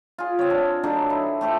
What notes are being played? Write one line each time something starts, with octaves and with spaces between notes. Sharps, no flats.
F4 G#4
C4 C#5
D4
D3 F#3 D4 D#4
E4
A3 G4 A4 C5